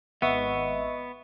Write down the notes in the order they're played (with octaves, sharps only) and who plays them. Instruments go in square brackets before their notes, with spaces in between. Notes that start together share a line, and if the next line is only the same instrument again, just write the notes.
[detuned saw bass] G#1 [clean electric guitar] B3 [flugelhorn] D#5 [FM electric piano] E5 F#5 C#6